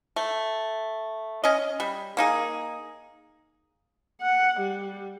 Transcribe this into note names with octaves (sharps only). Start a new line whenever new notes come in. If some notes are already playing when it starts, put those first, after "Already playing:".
A3
C#4 D#5
G3
A#3 D#4 G#4
F#5
G3